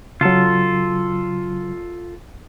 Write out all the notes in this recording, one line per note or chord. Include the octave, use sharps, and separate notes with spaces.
C#3 F#3 F4 A4